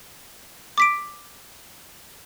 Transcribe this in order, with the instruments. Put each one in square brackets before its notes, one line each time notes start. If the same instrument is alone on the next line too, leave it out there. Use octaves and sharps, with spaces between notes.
[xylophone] D6 B6 D7